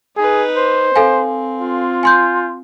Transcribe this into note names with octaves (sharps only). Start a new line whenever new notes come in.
D#4 G#4 B4
C5
C4 A4 F5 G#5
F4
G#5 C6 G6